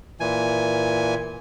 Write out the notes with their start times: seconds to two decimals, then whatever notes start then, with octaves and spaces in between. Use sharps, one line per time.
0.20 A#2 E3 G#5